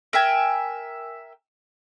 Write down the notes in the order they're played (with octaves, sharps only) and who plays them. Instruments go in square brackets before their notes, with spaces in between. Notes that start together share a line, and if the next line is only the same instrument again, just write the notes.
[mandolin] A#4 E5 G5 G#5